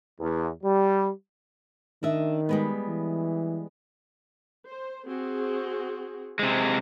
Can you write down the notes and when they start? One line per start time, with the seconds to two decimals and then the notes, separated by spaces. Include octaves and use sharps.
0.20 E2
0.64 G3
2.03 D#3 D4 D#5 E5
2.49 G3 G#3 B3
2.88 E3
4.65 C5
5.06 C4 F#4 G#4
6.39 C3 G#3 C5